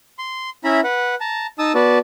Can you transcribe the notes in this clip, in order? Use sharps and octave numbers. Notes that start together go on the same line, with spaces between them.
C6
C#4 E4 E5 A#5 B5
B4 F#5
A5 A#5
D#4 A5 D#6 E6
B3 F#4 B4 D5 A5